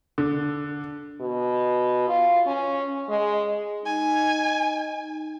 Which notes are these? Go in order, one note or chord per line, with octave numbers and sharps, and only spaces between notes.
D3
B2
F4
C#4
G#3
D#4 G#5